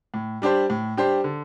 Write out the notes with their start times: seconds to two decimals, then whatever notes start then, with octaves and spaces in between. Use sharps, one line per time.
0.14 A2
0.42 G3 D4 G4 C5
0.70 A2
0.97 G3 D4 G4 C5
1.24 D3